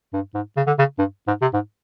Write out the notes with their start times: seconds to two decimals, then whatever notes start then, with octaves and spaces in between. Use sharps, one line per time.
0.13 G2
0.34 G#2
0.57 C#3
0.67 D3
0.79 C#3
0.99 G2
1.27 G#2
1.42 C3
1.54 G#2